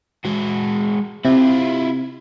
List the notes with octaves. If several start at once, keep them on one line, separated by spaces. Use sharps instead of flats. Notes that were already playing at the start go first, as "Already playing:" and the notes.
G#3 F#4
C3 E4 F4